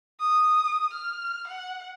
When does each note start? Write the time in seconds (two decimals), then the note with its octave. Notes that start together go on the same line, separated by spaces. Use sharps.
0.20 D#6
0.93 F6
1.47 F#5